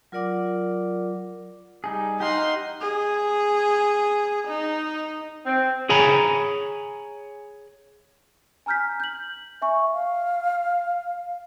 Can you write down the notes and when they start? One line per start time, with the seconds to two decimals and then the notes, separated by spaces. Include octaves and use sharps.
0.12 F#3 F4 A#4 D5 F#5 D6
1.84 G3 D#4 G#4
2.20 D#4 G4 F5 F#5 C6
2.81 G#4
4.48 D#4
5.45 C4
5.89 G#4 C#5 G#5 A#5 B5
8.66 G#5 A#5 F6 G6 B6
9.00 G6 F#7
9.62 E5 G#5 C#6
9.94 F5